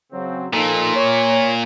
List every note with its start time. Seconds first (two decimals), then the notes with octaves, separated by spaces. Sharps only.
0.12 C#3 F#3 C4
0.53 A#2 F3 D#4 A4
0.95 C#5